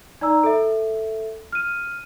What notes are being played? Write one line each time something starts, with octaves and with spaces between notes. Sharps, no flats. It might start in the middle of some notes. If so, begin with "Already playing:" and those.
D#4 D5 A#5 E6
A4 E5
F6 D#7